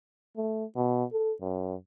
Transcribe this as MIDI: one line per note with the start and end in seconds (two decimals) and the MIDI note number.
0.36 0.65 57
0.76 1.04 47
1.12 1.33 69
1.41 1.74 42